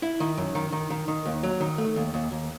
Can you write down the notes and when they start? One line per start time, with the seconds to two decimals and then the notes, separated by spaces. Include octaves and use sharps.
0.02 E4
0.20 D#3
0.38 F#2
0.55 D#3
0.72 D#3
0.90 D#3
1.08 D#3
1.25 D#2
1.43 F#3
1.61 D#3
1.78 A3
1.96 D#2
2.14 D#2
2.32 D#2